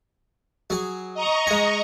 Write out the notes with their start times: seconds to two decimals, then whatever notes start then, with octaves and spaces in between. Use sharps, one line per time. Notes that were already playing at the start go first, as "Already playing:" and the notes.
0.70 F#3 G#4
1.14 D#5 A#5 C#6
1.47 G#3 G#5